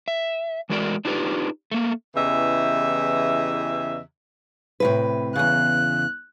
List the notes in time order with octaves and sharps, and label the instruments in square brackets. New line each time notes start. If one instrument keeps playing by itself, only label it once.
[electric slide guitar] E5
E3 G#3 A3 F#4 A#4 D5
D4 D#4 F4 G4 B4
A3 A#3
[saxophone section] E2 C#3 E3 G4 D#5 E5
[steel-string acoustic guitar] A2 C3 B4
[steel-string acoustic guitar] E2 C#3 [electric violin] F#6